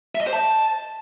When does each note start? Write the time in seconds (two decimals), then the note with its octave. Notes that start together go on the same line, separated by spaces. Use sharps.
0.15 E5
0.21 D#5
0.27 C5
0.33 A5